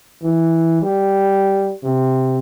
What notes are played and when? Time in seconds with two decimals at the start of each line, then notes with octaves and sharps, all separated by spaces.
0.23 E3
0.82 G3
1.84 C3